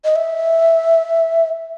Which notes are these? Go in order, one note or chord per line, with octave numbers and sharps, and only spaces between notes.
D#5
E5